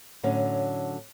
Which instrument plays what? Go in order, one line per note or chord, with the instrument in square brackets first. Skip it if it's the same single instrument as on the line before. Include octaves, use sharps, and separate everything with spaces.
[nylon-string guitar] A2 D3 F#3 C#4